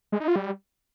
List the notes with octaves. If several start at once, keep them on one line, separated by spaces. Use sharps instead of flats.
G#3
D#4
F4
G3